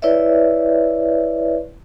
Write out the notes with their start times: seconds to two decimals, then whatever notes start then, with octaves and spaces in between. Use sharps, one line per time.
0.02 E4 B4 C#5 D5 E5